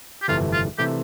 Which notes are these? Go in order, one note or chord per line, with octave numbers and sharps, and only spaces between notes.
G4
G1 F2 C3 E3 A3 F4
F4
C3 E3 A3 G4